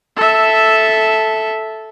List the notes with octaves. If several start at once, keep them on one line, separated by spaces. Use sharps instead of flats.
A4 E5